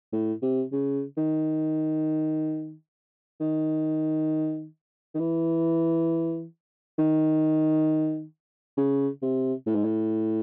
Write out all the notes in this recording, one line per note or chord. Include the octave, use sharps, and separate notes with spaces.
A2
C3
C#3
D#3
D#3
D#3
E3
D#3
C#3
C3
A2
G#2
A2